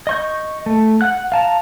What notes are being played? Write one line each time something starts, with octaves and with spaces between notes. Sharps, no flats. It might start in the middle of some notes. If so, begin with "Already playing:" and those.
D#5 C#6 G6
A3
F#5 F#6
F5 A5 A#5